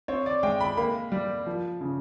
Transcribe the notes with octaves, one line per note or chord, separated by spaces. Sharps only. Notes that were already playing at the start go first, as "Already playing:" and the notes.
C4 C#5
D5
G#3 G5
B5
A#3 B5
G3
F3
C#3